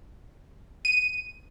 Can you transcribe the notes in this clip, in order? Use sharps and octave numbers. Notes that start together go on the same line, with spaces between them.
D#7